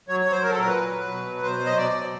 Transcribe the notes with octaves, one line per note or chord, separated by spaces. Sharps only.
F#3 C#5
C#5
F#3
C5
F#3 A#4
A4
A#2 A#4
B4
F#3
F#3
B2
F#3
B2 C5
F#3
D#5
B2 D5
F#3